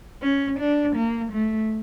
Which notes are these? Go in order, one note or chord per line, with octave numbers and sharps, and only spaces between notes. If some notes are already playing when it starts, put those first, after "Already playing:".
C#4
D4
A#3
A3